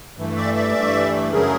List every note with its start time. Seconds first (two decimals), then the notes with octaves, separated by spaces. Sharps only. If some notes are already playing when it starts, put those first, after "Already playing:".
0.17 G2 E3 A3
0.36 D5 E5
0.56 D5 E5
0.75 G2 E3 A3
1.32 F#2 C#3 F#3 A3 G#4 A#4